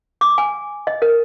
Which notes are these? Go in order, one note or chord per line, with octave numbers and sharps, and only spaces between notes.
D6
G#5
D#5
A#4